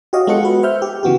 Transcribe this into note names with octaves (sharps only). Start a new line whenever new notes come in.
F#4 G4 C#5 D#5 F5
G#3 B3 F4 A4 F#5 C#7
F#4 B4
C5 E5 F6 G6
G4
C#3 E3 B3 F#4 G4